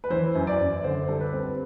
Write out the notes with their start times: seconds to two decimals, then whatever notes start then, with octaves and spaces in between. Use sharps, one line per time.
0.04 B4
0.10 E3 C5
0.35 F#2
0.47 D5
0.59 F#2
0.84 D3 C5
1.08 G3 A4
1.20 B4
1.33 C4